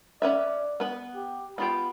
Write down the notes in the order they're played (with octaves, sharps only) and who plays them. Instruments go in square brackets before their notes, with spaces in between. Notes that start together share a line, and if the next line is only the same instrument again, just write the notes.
[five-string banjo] C#4 B4 E5 [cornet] D5
[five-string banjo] B3 B4
[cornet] G4
[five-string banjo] B3 F4 G4 [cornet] B5